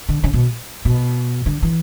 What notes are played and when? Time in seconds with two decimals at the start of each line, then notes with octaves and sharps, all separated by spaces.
0.09 D3
0.24 C#3
0.34 B2
0.85 B2
1.46 D3
1.62 E3